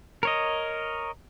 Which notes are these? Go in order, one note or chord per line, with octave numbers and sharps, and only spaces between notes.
A#4 C#5 D#5